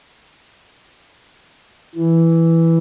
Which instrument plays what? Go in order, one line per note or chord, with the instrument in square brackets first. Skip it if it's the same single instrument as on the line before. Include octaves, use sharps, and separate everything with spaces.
[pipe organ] E3